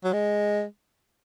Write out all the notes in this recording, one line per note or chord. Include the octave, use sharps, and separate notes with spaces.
F#3
G#3